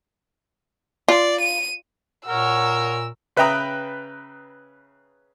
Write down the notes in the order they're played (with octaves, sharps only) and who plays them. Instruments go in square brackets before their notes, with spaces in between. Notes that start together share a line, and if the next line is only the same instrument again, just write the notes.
[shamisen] F4 [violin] D5
[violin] D#7
[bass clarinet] A#2 [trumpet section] A#4 [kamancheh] C#5 F#5 [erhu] E6
[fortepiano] C#3 B4 E5 G5 A#5 D#6